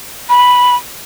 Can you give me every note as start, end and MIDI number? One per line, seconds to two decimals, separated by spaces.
0.29 0.75 83